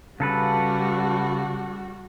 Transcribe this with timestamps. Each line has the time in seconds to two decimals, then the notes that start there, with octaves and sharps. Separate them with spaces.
0.20 C#3 G3 F#4 A4 B4